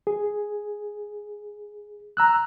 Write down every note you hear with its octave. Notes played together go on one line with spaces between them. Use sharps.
G#4
A#5 E6 F#6